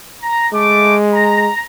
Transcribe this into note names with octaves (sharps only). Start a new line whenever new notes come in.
A#5
G#3 A3 D6
A#5